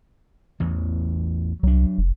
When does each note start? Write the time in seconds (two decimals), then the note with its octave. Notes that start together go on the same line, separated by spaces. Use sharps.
0.60 A1 E2 E3
1.63 C2 F#3 D4
1.98 F1